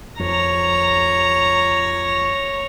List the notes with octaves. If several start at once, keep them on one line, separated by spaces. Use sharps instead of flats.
F2 C#5 A#5